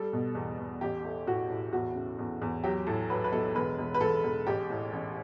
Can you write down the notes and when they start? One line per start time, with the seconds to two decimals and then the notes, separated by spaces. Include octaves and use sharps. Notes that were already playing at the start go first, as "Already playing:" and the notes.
Already playing: G3 A4
0.13 B2
0.35 E2
0.58 E2
0.81 A1 G4
1.04 A3
1.27 A2 F#4
1.50 A2
1.73 E2 F#4
1.95 C#3
2.19 E2
2.42 E2
2.64 F#3 G4
2.87 A2 A4
3.09 F#3 B4
3.24 B4
3.32 B1 A4
3.55 E1 B4
3.78 E1
3.94 B4
4.01 E1 A4
4.24 E1
4.47 A1 G4
4.70 A2
4.93 A1